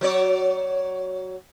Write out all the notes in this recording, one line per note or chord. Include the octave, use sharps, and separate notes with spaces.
F#3 C#5 D5